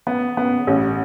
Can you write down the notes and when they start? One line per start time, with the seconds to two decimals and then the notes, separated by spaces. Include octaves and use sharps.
0.07 B3
0.37 B3
0.67 A1